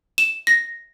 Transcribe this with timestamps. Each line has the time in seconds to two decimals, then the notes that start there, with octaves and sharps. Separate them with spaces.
0.18 E7
0.47 A#6